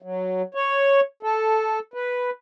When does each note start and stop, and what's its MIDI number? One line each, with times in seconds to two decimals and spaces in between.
0.02 0.42 54
0.55 1.00 73
1.23 1.79 69
1.94 2.30 71